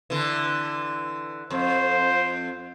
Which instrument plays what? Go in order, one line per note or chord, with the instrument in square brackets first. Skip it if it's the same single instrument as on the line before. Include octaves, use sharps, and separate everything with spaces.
[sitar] D3 E3
[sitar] F2 [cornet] C5